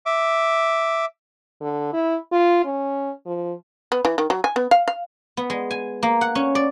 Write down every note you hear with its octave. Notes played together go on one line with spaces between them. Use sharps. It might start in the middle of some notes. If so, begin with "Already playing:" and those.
E5 D6
D3
E4
F4
C#4
F3
B3
E3
D#3
F#3
G#5
B3
F5
F5
B3
G#3
G#5
A#3
F#5
C#4
D5